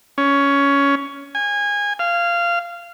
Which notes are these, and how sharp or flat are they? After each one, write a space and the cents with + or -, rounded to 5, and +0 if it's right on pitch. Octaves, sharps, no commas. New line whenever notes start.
C#4 +15
G#5 -25
F5 -15